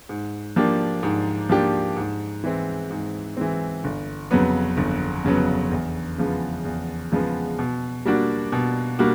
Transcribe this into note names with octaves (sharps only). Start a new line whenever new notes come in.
G#2
F3 A#3 D4 G4
G#2
F3 A#3 D4 G4
G#2
E3 G#3 C4
G#2
E3 G#3 C4
G1
F2 C#3 F#3 B3
G1
F2 C#3 F#3 B3
E2
C#3 F3 G#3 B3
E2
C#3 F3 G#3 B3
B2
G3 A#3 D4 F#4
B2
G3 A#3 D4 F#4